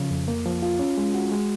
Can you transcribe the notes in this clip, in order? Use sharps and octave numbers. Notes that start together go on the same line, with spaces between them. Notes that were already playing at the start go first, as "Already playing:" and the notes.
Already playing: C#3 F3
F2
A#3
F3
F4
C#4
G#3
F#4
G#3